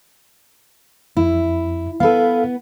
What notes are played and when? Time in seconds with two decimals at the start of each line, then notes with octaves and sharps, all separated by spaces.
1.17 F2 E4
2.00 B3 A4 B4 F5